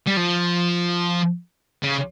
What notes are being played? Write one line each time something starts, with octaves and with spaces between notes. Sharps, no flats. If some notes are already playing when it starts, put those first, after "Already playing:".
G3
F3
C#3